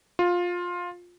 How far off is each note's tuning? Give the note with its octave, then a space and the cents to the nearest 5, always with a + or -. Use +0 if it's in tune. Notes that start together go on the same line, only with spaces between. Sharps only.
F4 +15